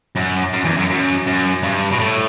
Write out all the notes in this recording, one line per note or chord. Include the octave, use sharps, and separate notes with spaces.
F#2
F#2
E2
F#2
F#2
F#2
G2
B2
A2